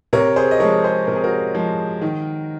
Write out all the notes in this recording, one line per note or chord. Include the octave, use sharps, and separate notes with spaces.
C3 A#4 C#5
G#4 C5
D#5
F3 G#3 A#4 C#5
G#4 C5
C3 A#4
G#4
F#4 A#4
F3 G#3
D#3